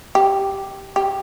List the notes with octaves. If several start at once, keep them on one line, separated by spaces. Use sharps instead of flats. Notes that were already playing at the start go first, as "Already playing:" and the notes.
G4
G4